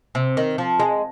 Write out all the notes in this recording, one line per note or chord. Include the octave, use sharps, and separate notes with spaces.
C3
D#3
F3
G#3